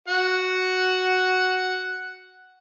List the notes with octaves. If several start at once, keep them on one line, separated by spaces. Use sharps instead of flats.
F#4 F#5